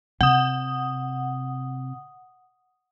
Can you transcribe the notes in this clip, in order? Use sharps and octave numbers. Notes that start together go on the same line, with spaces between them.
C3 F#5 D#6